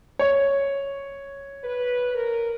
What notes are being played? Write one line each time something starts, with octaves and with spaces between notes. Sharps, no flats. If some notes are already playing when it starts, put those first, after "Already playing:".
C#5
B4
A#4